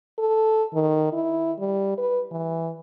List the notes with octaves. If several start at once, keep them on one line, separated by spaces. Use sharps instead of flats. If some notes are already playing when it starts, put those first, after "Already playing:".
A4
D#3
E4
G3
B4
E3